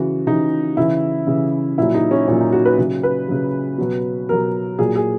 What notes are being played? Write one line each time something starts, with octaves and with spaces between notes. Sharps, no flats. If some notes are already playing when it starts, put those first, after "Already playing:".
Already playing: C#3 E3 F#4
C#3 E3 D#4
C#3 E3 E4
C#3 E3
A#2 F#3 E4
D#4
C#4
A#2 F#3 C#4
D#4
F#4
B4
C#3 F#3
B4
C#3 F#3
B2 F#3
B2 F#3 A#4
A#2 F#3 G#4
G#4